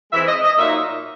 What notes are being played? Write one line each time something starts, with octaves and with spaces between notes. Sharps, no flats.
E3 G#3 C4 E4 E5
D#5
D#5
A#2 F#3 A#3 D#4 E5